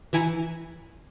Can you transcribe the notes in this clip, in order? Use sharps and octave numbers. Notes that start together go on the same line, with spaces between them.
E3 E4 G#5 A#5 C#7